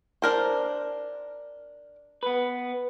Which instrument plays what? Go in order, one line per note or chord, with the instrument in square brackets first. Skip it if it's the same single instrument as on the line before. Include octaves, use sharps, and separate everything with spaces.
[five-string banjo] D4 A#4 C5
[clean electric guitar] B3 B4